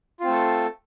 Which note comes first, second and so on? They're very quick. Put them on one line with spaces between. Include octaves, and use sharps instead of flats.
F4 C4 A3 A4